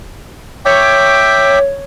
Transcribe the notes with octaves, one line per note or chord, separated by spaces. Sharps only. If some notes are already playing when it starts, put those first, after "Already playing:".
C#5 E5 G5 D6